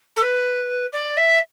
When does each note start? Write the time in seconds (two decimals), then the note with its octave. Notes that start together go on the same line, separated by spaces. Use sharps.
0.16 A4
0.22 B4
0.92 D5
1.17 E5